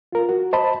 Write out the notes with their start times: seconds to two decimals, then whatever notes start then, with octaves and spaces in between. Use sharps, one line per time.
0.12 F4 A#4
0.29 F#4
0.53 C5 D#5 A5 B5